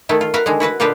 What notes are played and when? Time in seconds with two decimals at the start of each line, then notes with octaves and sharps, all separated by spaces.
0.09 D#3 A3 E4
0.21 F4
0.34 F#4 A#4 B4 E5 F5
0.46 D3 D#3 G#3
0.60 E4 F#4 B4 F#5
0.80 A#2 D3 F4 G4 B4 D#5